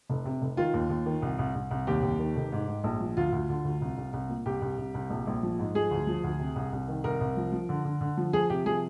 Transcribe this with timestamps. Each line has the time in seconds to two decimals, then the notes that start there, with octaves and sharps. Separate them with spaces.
0.10 F1
0.25 C3
0.42 F1
0.57 D#3 F4
0.74 D#2
0.90 D#2
1.06 D#3
1.22 C2
1.39 C2
1.55 C2
1.71 C2
1.87 D#2 G4
2.03 D#2
2.19 D#3
2.36 F1
2.52 G#2
2.68 G#2
2.84 A#1
3.00 F3
3.17 D2 F4
3.32 D2
3.49 D3
3.65 D2
3.81 C2
3.98 C2
4.13 C2
4.30 A#2
4.46 C2 G4
4.62 C2
4.78 C2
4.94 C2
5.10 A#1
5.27 A#1
5.43 F3
5.59 G#2
5.75 F3 G#4
5.91 D2
6.07 F3
6.24 D2
6.39 C3
6.56 C2
6.72 C2
6.88 D#3
7.04 C2 A#4
7.21 C2
7.37 F3
7.52 F3
7.69 D3
7.85 D3
8.01 D3
8.17 F3
8.33 F3 G#4
8.50 C3 G4
8.66 F3 G#4